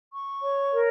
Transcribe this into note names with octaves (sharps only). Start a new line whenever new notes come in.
C#6
C#5
A#4